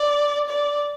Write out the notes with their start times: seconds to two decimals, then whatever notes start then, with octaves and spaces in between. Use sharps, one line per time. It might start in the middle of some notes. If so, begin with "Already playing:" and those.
Already playing: D5
0.49 D5